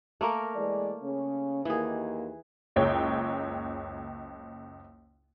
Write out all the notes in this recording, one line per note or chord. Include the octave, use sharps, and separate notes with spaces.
A3 A#3 A#4
E3 G#3 D5
C#3 C#4
D#2 E3 A#3 G#4
F#1 C#2 C#5 G5